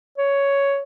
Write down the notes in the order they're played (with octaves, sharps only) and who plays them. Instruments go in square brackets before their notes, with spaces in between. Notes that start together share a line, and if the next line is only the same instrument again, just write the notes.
[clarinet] C#5